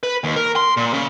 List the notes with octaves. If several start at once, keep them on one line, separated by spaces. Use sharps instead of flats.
B4
D#2
A#4
C6
A#2
C#3